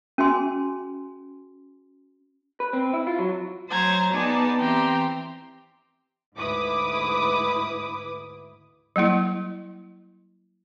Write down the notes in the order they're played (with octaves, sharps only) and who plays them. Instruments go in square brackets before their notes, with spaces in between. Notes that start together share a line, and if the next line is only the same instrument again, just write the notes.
[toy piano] C#4 F#4 G#4 G#5 C6
[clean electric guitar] B4
C4
E4
F4
F#3
[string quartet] F#3 C5 A#5 C6 G#6 A6
B3 D#4 G#4 D5 A5
E3 C4 G4 G5 A#5 C6
[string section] D2 G#2 E4 B4 D6 D#6
[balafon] F#3 G3 A#3 E4